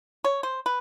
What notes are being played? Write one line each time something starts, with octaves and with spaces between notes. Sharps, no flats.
C#5
C5
B4